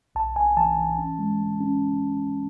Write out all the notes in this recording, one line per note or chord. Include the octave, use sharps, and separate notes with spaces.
B1 A5
B1 G#5
E3 A5
E3
C#4
G#3
G#3
C#4